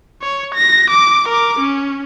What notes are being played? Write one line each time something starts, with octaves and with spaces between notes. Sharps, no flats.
C#5
A#6
D6
A#4 D6
C#4